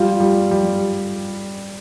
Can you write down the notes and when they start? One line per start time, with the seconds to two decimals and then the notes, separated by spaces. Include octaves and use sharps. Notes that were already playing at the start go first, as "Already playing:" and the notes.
Already playing: G3 F4
0.20 G3
0.51 G3